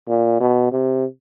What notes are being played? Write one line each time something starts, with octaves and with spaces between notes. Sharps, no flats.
A#2
B2
C3